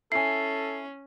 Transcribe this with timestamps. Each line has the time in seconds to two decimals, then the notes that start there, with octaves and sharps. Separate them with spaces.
0.12 C#4 E4 A4 G#5 C7